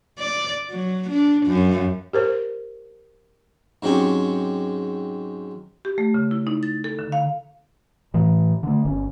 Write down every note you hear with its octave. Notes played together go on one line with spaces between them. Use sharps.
D5
F#3
D4
F#2
G4 A#4 C5
G#2 F#3 C4 C#4 G4 C#6
G4
A3
C#3
E4
D#4
A6
A4
D3
F5
A2 E3
D3 A3
G1 C#4